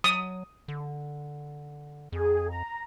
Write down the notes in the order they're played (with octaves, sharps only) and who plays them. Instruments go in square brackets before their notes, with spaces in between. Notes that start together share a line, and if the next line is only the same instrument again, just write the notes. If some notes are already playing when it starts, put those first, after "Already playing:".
[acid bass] F#3 [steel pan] D#6
[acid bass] D3
[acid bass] F2 [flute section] G#4
[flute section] A#5